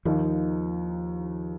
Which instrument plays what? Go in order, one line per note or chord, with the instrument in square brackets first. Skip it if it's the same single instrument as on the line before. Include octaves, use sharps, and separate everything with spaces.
[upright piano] D#2 D#3 A#3 D#4 [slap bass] F3